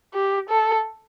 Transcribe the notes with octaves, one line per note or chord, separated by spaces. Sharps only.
G4
A4